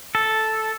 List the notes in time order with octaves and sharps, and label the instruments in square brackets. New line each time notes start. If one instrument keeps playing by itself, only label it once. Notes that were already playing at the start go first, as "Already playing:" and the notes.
[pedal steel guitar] A4